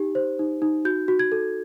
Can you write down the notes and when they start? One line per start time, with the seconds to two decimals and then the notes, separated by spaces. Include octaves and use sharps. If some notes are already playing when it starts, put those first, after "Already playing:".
Already playing: D#4 G4
0.15 C5
0.39 D#4
0.62 D#4
0.85 F#4 G6
1.08 F#4
1.19 G#6
1.32 A4